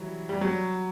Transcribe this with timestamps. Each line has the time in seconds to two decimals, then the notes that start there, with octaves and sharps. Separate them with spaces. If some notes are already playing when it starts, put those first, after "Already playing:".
Already playing: E3 F#3 G3
0.29 G3
0.41 F#3